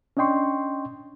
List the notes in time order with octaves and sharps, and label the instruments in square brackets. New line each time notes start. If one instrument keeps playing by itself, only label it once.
[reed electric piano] C#4 D4 D#5 G5 C6 C#6